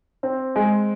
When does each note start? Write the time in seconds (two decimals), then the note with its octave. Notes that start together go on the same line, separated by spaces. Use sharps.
0.23 C4
0.56 G#3